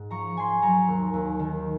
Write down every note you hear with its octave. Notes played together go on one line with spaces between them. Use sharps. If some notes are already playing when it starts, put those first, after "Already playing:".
Already playing: G#2
F3 A#5 C#6
F3 G#5 C6
F#3 A#5 C#6
D#2
D#2
D#3